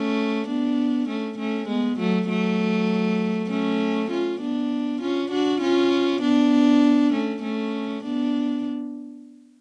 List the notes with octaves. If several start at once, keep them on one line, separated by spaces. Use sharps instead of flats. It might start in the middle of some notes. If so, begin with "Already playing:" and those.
Already playing: A3 C#4
B3 D4
A3 C#4
A3 C#4
G#3 B3
F#3 A3
F#3 A3
A3 C#4
C#4 F4
B3 D4
C#4 F4
D4 F#4
C#4 F4
B3 D4
A3 C#4
A3 C#4
B3 D4